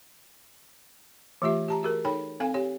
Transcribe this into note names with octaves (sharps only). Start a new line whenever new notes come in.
E3 A3 F4 G4 E5
G4 A5 A#5
F#4 G#4 A#4
D#4 A4 C#5 G5 B5
C4 A4 F5 G#5
G4 C#5